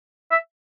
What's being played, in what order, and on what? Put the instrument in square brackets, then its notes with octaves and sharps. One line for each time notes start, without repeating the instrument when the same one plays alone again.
[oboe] E5